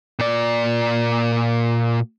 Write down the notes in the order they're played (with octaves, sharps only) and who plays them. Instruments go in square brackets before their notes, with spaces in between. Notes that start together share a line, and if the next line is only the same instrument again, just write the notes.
[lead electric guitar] A#2 D5